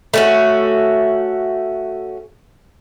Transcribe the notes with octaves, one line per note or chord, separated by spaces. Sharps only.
A3 C#4 F#4